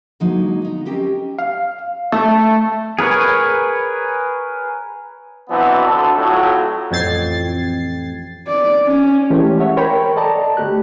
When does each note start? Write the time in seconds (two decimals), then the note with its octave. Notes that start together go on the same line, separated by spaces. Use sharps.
0.20 D3 F3 F#3 G#3 A#3 D#4
0.62 B3 D#4
0.85 C4 C#4 G4 A#4 D#5 F5
1.39 F5
2.12 A3
2.99 G#4 A#4 B4 C#5
5.49 B2 E3 F#3 B3 C4 D4
5.86 D2 A4
6.15 F2 A2 F#3
6.91 A1 F2 G5 G#6 A6 C7
8.47 D5
8.87 C#4
9.30 E3 G#3 A3 C#4 G4 C#5
9.59 C#5 E5 F#5
9.77 A#4 C5 C#5 G5 B5
10.16 A4 D5 D#5 A5 A#5
10.57 D2 A3 G4 F#6